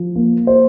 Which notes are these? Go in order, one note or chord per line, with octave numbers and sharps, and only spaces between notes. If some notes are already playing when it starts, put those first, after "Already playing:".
Already playing: F3
A#3
C5